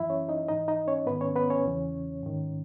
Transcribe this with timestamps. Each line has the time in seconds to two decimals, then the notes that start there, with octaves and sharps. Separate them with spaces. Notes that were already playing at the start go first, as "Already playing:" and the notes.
Already playing: F#2 E3 E4 E5
0.09 C#4 C#5
0.29 D#4 D#5
0.48 G#2 E3 D#4 D#5
0.68 D#4 D#5
0.88 C#4 C#5
1.07 G#2 D#3 B3 B4
1.21 C#4 C#5
1.35 B3 B4
1.50 C#4 C#5
1.65 E2 C#3 E3
2.23 G#2 D#3